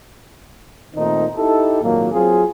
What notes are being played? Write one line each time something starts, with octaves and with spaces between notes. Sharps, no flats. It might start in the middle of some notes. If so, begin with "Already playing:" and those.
A#2 D#3 A3 C4 D#4
D#4 E4 G4 A4
G#1 A#2 F#3 A#3
F#3 C4 F4 G#4